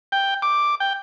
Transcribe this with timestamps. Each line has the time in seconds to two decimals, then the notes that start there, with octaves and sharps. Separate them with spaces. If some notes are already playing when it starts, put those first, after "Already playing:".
0.12 G5
0.42 D6
0.80 G5